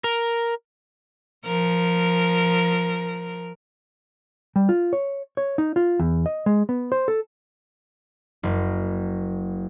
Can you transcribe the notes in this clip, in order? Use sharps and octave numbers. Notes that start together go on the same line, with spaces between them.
A#4
F3 A#4
G3
F4
C#5
C#5
D#4
F4
E2
D#5
G#3
B3
C5
A4
F#1